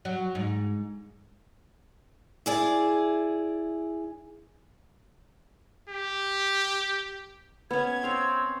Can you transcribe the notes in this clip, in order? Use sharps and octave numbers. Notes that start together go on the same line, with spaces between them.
F#3
G#2
E4 G#4 D5
G4
B3 C#4 G#6
C4 C#5 F5 G5